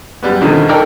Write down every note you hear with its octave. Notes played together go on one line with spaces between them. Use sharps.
F#2 G3 B3
E2 B2 D3 D#3 F3
D#4 A4 A#4 D5 G5